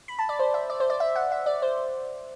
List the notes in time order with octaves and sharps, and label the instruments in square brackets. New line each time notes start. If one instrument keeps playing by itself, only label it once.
[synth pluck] B5
A5
D5
C5
E5
D5
C5
D5
E5
F#5
E5
D5
C5